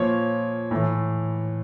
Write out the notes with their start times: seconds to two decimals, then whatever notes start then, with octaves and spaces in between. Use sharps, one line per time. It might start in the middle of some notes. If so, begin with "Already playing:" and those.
Already playing: A#2 F3 C#5
0.71 A2 E3